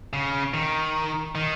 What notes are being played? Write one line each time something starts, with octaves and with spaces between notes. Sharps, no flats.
C#3
D#3
D#3